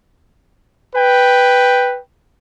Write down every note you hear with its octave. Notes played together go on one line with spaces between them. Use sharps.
B4 G5